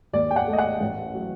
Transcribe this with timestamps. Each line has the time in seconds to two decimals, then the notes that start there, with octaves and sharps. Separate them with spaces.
0.13 D#2 D5
0.31 G5
0.36 F#5
0.47 A3
0.53 D#5
0.58 F#5
0.80 A1
1.14 F#3